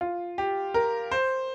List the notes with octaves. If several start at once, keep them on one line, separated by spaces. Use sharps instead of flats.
F4
G4
A#4
C5